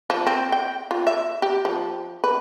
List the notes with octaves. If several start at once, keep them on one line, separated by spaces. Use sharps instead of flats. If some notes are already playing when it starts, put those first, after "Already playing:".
F3
C4
G5
F4
E5
G4
F3
B4